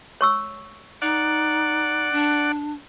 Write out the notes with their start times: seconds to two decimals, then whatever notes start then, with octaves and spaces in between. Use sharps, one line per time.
0.21 C#5 C#6 E6
1.02 D#4 D5 F#5
2.12 D4